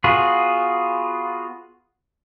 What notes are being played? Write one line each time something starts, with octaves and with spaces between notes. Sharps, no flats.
B3 F4 F#4 G#4